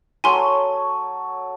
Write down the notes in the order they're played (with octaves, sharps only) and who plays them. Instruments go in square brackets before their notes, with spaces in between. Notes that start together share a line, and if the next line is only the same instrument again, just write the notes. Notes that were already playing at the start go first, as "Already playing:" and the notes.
[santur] F#3 A4 C#5 [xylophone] G#5 C6